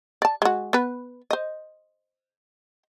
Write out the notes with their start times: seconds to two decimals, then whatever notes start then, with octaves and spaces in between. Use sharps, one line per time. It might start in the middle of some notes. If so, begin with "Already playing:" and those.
0.22 D5 A5
0.42 G#3 F#4
0.73 B3 B4
1.31 C5 D#5